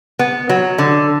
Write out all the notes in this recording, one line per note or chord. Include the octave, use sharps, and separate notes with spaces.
B3
F#3
D3